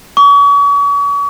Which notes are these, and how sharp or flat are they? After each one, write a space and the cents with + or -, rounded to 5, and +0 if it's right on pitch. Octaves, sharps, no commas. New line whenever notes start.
C#6 +40